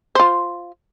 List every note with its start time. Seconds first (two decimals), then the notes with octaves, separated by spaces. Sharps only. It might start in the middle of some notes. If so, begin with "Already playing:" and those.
0.15 F4 C5